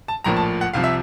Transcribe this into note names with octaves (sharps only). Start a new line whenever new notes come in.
A5
A#1 A2 F3 A#3 A#5
A5
F#5
C2 C3 F3 F5
E5